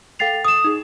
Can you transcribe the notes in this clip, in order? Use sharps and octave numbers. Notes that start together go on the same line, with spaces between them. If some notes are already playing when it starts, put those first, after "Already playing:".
A4 F5 G5 A6 C7 F7
D#6 E7
D#4 G#4